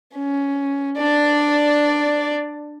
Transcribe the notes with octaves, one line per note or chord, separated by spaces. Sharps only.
C#4
D4 D5